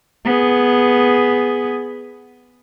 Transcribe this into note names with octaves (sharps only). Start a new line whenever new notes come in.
B3 G#4